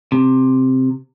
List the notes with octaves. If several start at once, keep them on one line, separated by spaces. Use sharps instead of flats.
C3